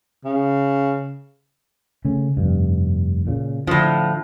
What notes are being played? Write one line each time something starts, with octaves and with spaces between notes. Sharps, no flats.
C#3
C#3 A3 C#4
F1 G2
A#2 C#3
A2 D3 F3